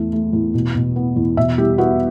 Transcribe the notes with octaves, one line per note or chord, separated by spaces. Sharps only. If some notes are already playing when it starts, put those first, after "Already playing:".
Already playing: E2 A3
A3
E2
B2
B2
B3
E2
B2 E5
G3 G4
B3 F#4